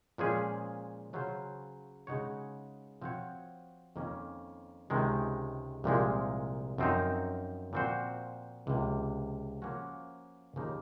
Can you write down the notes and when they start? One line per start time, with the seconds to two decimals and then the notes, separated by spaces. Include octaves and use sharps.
0.18 A#2 F3 G#3 C#4 G#4
1.13 C#3 F#3 C#4 F4 C5
2.07 C#3 G#3 D#4 F#4 C#5
3.02 F3 C4 F#4 C#5
3.96 F2 D#3 A#3 C#4
4.90 C#2 C3 D#3 G#3
5.84 C2 A#2 F3 G#3
6.78 F#2 F3 C4 D#4
7.73 A#2 F3 C4 F#4 C5
8.67 C#2 C3 F3 A#3
9.62 F3 A#3 C#4 F#4
10.56 D#2 C#3 F3 A#3 D#4